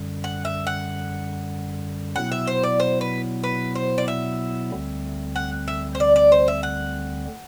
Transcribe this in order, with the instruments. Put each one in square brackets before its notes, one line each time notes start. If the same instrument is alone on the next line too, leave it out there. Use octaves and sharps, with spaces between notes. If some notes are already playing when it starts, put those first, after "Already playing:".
Already playing: [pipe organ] F#2 D3 G3
[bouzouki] F#5
E5
F#5
[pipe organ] B2 F#3 B3 E4 [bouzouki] F#5
[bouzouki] E5
C5
D5
C5
B4
B4
C5
D5
E5
[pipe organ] D2 D3 G3 C4
[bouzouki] F#5
E5
C5
D5
D5
C5
E5
F#5